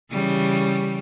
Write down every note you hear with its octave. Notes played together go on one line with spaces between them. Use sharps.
C#3 E3 G3